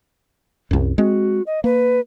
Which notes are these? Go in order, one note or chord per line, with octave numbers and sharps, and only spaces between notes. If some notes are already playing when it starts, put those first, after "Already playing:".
C2 F#2
G#3 C4 F#4
D#5
A#3 B4